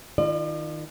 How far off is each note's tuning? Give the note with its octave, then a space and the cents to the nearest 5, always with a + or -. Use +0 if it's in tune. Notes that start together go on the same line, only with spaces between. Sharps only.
D#3 +0 F4 -30 D5 +45